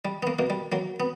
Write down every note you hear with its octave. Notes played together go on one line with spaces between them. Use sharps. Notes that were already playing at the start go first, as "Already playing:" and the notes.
G3
B3
A#3
B2 A#3
G3
F#3 A#3
B3